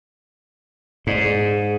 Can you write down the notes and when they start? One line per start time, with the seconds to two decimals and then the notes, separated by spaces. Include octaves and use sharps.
1.07 G#2 D5
1.23 G#4